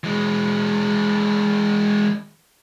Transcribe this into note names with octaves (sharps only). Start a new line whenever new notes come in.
E3 G#3